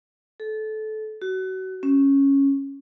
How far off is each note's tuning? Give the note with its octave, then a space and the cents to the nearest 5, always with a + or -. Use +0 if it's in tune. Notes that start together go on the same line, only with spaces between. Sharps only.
A4 -25
F#4 +30
C#4 -5